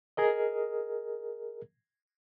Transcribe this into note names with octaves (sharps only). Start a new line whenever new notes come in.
G#4 A#4 D#5